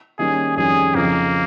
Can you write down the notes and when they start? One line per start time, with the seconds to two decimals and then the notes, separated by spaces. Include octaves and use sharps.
0.18 D#3 G3 A#3 C#4 G#4
0.56 F2 D#3 G3 C#4 G#4
0.95 F2 C#3 F3 A#3 C4 D#4